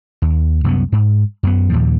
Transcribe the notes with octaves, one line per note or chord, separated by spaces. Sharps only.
D#2
C2 F#2 B3
G#2
F#2 B3
D#2 A#2 F3